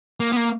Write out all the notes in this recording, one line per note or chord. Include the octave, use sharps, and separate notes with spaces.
A#3
B3
A#3